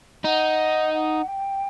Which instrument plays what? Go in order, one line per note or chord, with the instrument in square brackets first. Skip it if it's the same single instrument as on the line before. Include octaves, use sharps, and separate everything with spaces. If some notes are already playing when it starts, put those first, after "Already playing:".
[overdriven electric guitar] D#4 [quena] F#5
[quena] F#5
G5